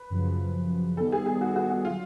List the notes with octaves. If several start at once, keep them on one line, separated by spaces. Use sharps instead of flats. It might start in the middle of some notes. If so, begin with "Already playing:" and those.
Already playing: B4
F#2 C#3 F3
D#3 G3 B3 A4
G#4
G#4
F#4
F#4
F#4
D3 F#3 F4